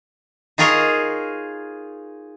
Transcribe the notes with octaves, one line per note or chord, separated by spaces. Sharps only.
D#4 F4 G#4 A#4 C#5 D#5